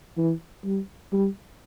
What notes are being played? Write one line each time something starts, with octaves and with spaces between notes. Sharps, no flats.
E3
G3
G3